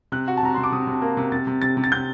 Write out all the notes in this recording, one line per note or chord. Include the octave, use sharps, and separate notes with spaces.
C3 F#6
F#4
A5
C3 A#5
C3 C6
D6
C3 D#6
C3
A#3
C3
C3 A6
C3
C3 A6
C3
A6
C3 G6